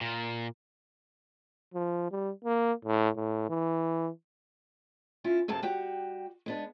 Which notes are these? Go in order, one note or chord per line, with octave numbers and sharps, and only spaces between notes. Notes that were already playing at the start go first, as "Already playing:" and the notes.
A#2
F3
G3
A#3
A2
A2
E3
C#4 E4 F4
F#2 C3 A#3 A4 A5
G3 F#4 G4
G#3 B3 D4